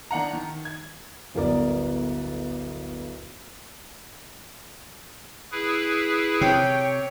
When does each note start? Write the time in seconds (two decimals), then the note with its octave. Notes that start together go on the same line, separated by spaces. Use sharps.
0.11 D#3 D4 F#5 A#5
0.33 D#3
0.65 G#6
1.34 D1 G1 B3 A#4 D5
5.52 E4 G#4 B4
6.41 C3 C#5 G5